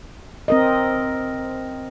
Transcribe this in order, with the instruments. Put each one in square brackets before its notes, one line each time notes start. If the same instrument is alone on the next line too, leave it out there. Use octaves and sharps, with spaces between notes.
[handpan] C4 A#4 D#5